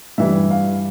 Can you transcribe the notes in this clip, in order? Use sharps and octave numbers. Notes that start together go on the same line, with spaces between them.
G2 E3 G3 E5
F5